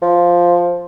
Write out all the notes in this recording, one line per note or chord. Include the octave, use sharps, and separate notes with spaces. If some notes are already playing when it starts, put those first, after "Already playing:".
F3